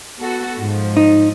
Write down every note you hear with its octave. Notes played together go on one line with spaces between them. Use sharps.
B3 F#4 A4
G#2 F3
D#4